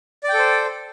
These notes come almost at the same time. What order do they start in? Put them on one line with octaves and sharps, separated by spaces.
D5 G5 A4 C5